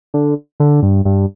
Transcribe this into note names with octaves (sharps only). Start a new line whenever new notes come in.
D3
D3
G2
G2